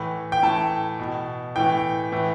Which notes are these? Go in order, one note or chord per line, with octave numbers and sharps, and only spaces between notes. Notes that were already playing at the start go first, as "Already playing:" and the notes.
Already playing: A2 E3
G5
A2 E3 A5
B2
A2 E3 G5
A2 E3